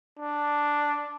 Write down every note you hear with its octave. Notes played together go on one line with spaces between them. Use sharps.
D4